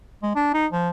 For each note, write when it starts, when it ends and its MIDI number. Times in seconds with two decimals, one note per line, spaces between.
0.23 0.32 56
0.35 0.53 62
0.54 0.67 63
0.72 0.90 53